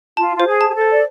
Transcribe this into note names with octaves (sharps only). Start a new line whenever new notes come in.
F4 A5
F4 C5
G#4
A5
G#4
A4
C5
D5